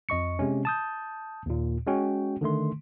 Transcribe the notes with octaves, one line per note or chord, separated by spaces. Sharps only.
F2 D#5 C#6 C#7
C3 G#3 C#4
A5 D#6 G6
D#2 A#2
G#3 C#4 F#4 G5
D3 D#3 A3 C6